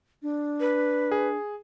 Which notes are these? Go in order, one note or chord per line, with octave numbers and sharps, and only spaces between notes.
D4
B4
G#4